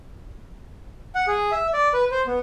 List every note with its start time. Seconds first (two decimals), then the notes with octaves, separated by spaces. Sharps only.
1.15 F#5
1.28 G#4
1.52 E5
1.74 D5
1.94 B4
2.11 C5
2.27 B3